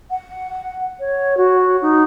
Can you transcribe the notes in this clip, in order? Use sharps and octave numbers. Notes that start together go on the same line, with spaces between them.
F#5
C#5
F#4
D#4